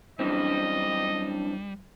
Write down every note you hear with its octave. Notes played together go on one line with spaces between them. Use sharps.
F#2 E3 G3 C4 D4 D#5